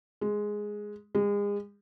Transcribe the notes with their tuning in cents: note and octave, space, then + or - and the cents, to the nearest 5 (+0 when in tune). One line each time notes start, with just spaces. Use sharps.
G#3 +0
G#3 -35